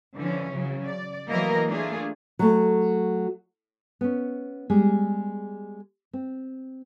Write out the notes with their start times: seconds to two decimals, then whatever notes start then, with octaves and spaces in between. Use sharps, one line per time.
0.16 D3 E3 F3 C#4
0.52 C#3 F#3
0.86 D5
1.29 E3 F#3 A3 A#3 A#4 D#5
1.65 A3 A#3 D4 F4 G#4
2.39 F#3 A3
4.01 B3 C#4
4.70 G3 G#3 G#4
6.13 C4